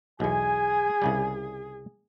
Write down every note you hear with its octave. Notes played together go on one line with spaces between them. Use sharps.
B1 E2 G#4 G#5
C2 C#3 G3